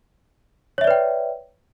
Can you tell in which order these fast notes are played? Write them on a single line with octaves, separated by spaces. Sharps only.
C#5 E5 D5 B4 G5